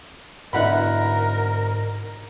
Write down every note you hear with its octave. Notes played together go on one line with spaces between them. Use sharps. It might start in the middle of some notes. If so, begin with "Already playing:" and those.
G#2 B2 D3 E4 A#4 F#5 B5